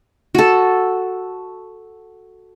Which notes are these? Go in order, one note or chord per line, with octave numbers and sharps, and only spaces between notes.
F#4 A4